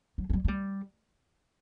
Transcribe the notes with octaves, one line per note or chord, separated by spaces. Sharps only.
F#3
A3
G3
A3
G3